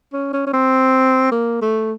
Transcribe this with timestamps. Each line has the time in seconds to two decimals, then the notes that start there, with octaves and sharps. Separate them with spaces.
0.13 C#4
0.33 C#4
0.47 C#4
0.53 C4
1.32 A#3
1.62 A3